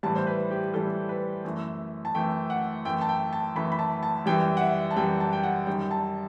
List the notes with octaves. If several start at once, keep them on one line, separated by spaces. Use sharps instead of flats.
A2 E3 G3 A5
C5
B4
G4
A2 E3 G3 A4
B4
F#2 E3 A3
A5
F#2 E3 A3 G5
F#5
F#2 E3 A3 G5
A5
G5
A5
F#2 E3 A3 B5
B5
A5
A5
F#2 E3 G3 G5
F#5
E5
A5
F#2 E3 G3 G5
A5
G5
F#5
F#2 D#3 G3 G5
A5